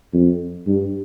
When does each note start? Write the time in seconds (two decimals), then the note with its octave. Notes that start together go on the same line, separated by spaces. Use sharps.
0.14 F2
0.67 G2